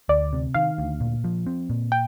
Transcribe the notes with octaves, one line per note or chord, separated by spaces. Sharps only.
D2 D5
C3
D#3 F5
D2
A#2
F3
C4
A#2
G5